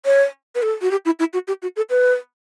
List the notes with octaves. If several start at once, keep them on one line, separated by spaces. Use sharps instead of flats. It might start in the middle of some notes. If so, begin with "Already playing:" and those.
C#5
B4
A4
F#4
G4
E4
E4
F#4
G4
F#4
A4
B4